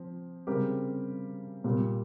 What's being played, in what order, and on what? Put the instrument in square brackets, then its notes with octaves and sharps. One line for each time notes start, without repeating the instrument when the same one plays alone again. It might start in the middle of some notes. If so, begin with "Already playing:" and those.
Already playing: [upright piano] F3 C4
C#3 G3 C4 G4 A#4
A#2 G3 A#3